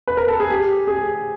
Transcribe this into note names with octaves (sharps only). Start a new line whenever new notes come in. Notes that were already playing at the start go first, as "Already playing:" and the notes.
B4
A#4
A4
G#4
G4
G#4